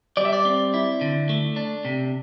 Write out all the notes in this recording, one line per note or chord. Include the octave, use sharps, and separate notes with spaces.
G3 D5
E5
D5
C4
E4
D3
A3
D4
C3